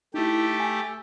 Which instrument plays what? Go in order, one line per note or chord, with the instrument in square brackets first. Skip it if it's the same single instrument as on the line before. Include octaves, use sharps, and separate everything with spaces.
[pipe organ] A3 G4 [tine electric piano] D#4 E4
[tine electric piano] G#5